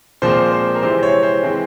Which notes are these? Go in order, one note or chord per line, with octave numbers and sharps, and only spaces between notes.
A#2 F3 G#3 C4 C5
C5
A#4
C3 E3 G#3 C4 C5
C#5
C5
E3 G#3 C4